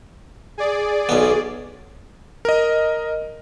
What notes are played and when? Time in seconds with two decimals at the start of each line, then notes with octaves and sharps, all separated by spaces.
0.58 G#4 D5
1.09 B1 B3
2.45 A#4 D#5